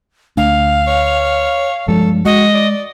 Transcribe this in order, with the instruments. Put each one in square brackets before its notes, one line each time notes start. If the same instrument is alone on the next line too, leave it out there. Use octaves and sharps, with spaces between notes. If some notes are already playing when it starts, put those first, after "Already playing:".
[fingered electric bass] D2 A3 D4 [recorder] F5
[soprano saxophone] C#5
[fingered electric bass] G2 F3 G#3 [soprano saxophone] A4
[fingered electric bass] G#3 [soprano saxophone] F#4 [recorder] D#5
[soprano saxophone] D5